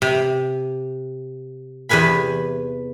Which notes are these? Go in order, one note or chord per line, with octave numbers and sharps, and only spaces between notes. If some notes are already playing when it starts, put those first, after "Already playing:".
C3
E2 C3 B4 G#5 B5